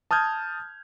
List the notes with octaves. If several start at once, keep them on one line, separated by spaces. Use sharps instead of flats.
A5 D#6 F6 G6 G#6